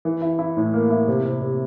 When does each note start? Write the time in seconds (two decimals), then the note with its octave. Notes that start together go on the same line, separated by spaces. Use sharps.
0.05 E3
0.22 E4
0.39 E4
0.57 A2
0.74 A#3
0.90 E4
1.08 C3
1.25 C3
1.42 C3